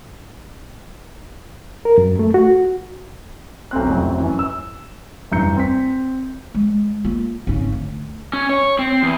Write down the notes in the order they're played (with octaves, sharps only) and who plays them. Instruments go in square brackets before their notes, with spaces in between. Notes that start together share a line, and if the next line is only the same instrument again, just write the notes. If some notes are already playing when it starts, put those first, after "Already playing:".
[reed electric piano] A#4
F#2
A3
F#4
[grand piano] B1 A3 C4 F#6
A1 F2 C3 F#3
F#2 E3
E6
F1 G2 E3 A#5 G6 C#7
C4 B6
[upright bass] G#3
A#3 F4
G#1 C#3
D2
[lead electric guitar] C#4
C#5
C4
E2